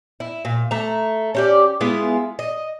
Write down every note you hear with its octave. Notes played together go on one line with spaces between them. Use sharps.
E4
A#2
A3 A#5
C#4 G4 D5
G#3 B3 E4 F4
D#5